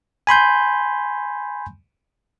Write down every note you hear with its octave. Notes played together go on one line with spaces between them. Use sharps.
G#5 B5 C6 G6